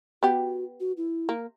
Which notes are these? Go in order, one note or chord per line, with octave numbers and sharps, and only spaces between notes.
B3 F#4 G4
F#4
E4
A#3